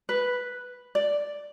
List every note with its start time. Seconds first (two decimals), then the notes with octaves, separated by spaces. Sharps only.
0.09 B4
0.95 D5